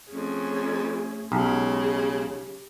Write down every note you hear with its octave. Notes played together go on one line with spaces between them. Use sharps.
F2 A3 C#4 G#4
B1 C#3 G#3 G4